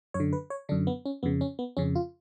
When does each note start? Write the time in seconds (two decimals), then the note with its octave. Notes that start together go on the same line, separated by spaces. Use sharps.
0.14 F#2 C#5
0.20 D3
0.33 B4
0.50 C#5
0.69 F#2 D3 D4
0.87 B3
1.06 C#4
1.23 F2 C#3 B3
1.41 C#4
1.59 B3
1.77 F2 C#3 C#4
1.95 F4